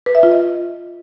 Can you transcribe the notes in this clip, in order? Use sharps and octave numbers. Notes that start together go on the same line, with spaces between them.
B4
E5
F4
D#5